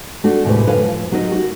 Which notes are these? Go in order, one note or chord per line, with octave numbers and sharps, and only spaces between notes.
A3 D4 F#4
D#2 A2 C3 F#3 G#3 B4
F#2 D3 B4 C#5 F5
F3
F#3 D#4 F#4 A#4 D#5
F#4